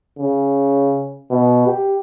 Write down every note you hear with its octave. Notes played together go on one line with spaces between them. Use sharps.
C#3
B2
G4